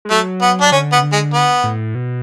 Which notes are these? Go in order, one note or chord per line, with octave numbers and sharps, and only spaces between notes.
G#3
F#3 A3
B3
D4
D3 C#4
B3
C#3
D3
G#3
B3
A2
B2